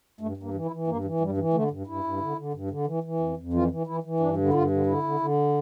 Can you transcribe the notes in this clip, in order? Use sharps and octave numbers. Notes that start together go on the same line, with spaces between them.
G2 A3
G2
A#3
E3
E4
E3
G2 A#3
E3
G2 G3
E3
D3 A3
G2
G2 E4
G2
D3
D3
G2
D3
E3
E3
F2
F2
E3 F4
E3
E3 E4
E3
G2 D4
D3
E4
G2 F4
D3
D3 E4
D3
D3